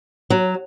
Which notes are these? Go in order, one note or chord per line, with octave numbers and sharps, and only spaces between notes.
F#3